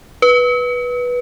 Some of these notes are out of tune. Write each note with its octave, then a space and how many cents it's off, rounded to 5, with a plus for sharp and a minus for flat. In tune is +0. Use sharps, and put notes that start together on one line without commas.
B4 -10